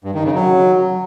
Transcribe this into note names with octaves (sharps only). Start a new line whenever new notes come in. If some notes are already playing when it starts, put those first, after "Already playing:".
G2
D#3
C#3
F#3